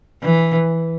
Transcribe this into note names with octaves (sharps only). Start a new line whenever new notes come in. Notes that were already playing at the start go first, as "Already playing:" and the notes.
E3